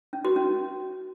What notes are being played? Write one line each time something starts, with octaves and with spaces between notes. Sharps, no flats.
C#4
F#4
C#4